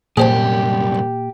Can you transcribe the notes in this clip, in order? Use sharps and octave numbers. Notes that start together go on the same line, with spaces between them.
C2 F#2 A#2 G4 G#4 C5 G#5